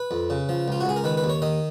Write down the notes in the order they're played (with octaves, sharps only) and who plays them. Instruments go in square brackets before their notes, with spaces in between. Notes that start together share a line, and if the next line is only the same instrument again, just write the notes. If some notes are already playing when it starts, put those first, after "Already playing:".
Already playing: [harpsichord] B4
F2
C#3
F3
C#2 F4
F#4
C#2 G#4
A#4
D#3 B4
B4
D#2
C#5
D#3 D#5